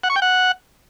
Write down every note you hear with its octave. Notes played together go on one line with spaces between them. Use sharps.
F#5
C#6
G5
F#5